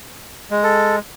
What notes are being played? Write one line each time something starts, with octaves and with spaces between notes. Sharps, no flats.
G#3
A4